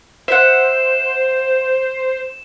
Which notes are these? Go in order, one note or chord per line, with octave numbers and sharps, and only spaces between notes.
C5 E5 F#5 E7